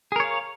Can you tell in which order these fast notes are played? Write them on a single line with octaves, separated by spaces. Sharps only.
G#4 A#4 C#5 F5